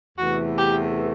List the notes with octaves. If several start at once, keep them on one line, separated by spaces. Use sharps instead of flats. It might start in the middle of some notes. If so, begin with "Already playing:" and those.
E2 C3 E3 A3 F#4
G4